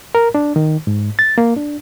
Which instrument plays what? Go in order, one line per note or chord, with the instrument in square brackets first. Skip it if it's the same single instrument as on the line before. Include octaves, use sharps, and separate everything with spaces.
[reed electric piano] A#4
D4
D#3
G#2
A6
A#3
D4